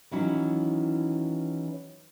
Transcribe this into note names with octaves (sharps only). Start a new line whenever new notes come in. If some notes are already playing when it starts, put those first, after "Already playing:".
D#3 E3 F#3 C#4 E4